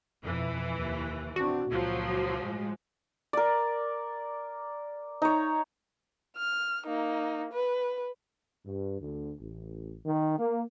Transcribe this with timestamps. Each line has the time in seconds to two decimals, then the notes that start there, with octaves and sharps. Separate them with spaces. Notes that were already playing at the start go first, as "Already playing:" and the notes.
0.23 F2 B2 E3
0.76 D#2
1.36 C4 D4 F#4
1.70 C#2 A#2 F3 F#3
2.41 A2 G#3
3.33 A#4 D5
5.22 D#4 C#5
6.37 F6
6.86 A#3 D#4
7.53 B4
8.65 G2
9.00 D2
9.40 A1
10.06 D#3
10.38 A#3